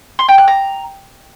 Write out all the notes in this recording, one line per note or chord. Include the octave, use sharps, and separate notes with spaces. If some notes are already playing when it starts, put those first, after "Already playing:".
C6
G5
F#6
A#5